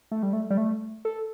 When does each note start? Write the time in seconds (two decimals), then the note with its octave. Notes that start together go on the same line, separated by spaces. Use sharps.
0.11 A3
0.23 G3
0.33 A3
0.50 G3
0.57 A3
1.05 A4